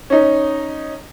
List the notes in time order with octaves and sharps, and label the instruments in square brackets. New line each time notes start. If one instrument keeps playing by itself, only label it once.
[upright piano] C#4 D#4